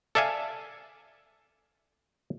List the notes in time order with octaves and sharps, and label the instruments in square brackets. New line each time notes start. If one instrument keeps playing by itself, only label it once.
[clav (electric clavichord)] A4 D5 E5 F5 G#5